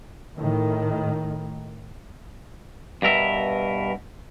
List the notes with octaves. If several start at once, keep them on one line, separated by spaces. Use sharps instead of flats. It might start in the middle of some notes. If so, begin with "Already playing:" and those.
A2 D#3
G2 B2 A#4 E5